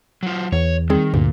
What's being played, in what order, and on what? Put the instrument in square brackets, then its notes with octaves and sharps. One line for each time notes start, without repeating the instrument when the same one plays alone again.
[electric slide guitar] F#3 F4
[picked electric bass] E2 [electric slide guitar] C#5
[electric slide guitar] D#3 [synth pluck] G3 C4 G#4
[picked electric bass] D2 [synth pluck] G2 [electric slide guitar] A#2